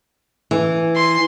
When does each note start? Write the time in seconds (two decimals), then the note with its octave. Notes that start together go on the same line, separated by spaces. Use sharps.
0.51 E3
0.96 C6